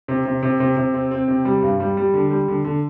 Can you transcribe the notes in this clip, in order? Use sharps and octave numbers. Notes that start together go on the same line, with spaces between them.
C3
C3
C3
C3
C3
C4
C4
C3
G3
G2
G3
G3
D3
G3
D3
D3